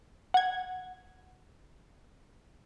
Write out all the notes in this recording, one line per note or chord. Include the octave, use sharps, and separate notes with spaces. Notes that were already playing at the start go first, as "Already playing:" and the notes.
F#5 G#6